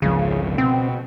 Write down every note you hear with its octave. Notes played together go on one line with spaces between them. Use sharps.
G#1 C#2 C#3 F3
B2 C4